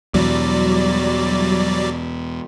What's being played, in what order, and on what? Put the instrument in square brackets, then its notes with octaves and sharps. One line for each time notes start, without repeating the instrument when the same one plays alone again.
[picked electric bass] E2 B2 [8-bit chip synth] F#3 G3 D5